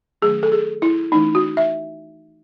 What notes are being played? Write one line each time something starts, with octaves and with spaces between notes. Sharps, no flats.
D#3 F#3 A3 C#4 G#4
A4
G#4
E4
E3 A3 C#4 D#4
F#4
E5